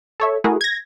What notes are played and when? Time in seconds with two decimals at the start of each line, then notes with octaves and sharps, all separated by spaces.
0.20 A4 C#5 E5
0.44 A3 E4 F#4 G#4 A#4
0.61 G#6 A#6